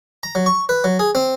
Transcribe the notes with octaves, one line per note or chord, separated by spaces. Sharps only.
A#5
F#3
C#6
B4
F#3
G#4
C4